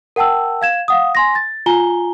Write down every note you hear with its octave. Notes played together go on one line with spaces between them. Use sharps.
A#4 F#5 G5 A5 E6
F5 G#6 E7
F5 F#5 D#6
G#5 C6 A#6
A6
F4 G#5 A#5 G7